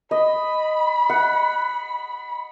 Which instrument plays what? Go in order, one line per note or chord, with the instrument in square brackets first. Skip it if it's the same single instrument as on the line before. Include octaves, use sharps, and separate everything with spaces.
[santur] D#5 [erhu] B5
[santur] F#5